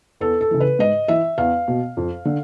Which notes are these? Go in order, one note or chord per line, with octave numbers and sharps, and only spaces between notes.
E2 A4
A4
C#3 E3
B4
G#2 D#5
E3 E5
E2 F5
B2
F2
D3